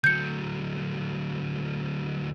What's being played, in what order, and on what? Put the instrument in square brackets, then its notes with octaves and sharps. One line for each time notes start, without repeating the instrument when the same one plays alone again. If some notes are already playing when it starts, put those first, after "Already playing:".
[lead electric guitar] D2 F#3 [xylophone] G6 C#7